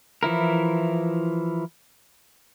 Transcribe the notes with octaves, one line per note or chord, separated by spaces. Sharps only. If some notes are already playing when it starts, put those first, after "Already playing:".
E3 F3 E4 A#4